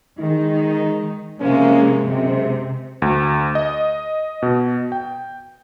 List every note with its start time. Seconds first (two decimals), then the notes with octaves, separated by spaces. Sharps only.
0.20 D#3 G#3 D#4
1.40 C3 F3 G#3 A#3 C#4
2.07 F#2 C3 G#3
3.02 D2
3.55 D#5
4.42 B2
4.92 G5